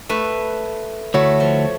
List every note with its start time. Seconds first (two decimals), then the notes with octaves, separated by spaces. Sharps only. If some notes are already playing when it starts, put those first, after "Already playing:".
0.09 A3 B4
1.14 D2 A3 E4 F#4 C#5
1.40 F3